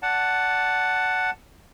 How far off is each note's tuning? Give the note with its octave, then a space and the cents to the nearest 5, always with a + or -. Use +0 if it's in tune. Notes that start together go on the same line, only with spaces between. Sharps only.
D5 -15 F#5 +5 A5 +0